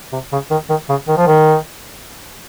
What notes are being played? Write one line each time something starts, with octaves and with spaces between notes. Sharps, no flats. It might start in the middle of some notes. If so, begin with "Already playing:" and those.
C3
C#3
D#3
D#3
C#3
D#3
F3
D#3